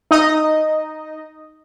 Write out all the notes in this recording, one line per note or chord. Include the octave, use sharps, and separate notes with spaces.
D#4 D#5